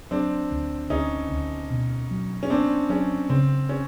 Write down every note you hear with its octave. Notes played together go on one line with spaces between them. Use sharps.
F#3 C4 D4
D2
D2 C#4 D#4
D2
B2
F#3
C#4
B3 C4 D4
F#3 C#4
C#3 C4
C#4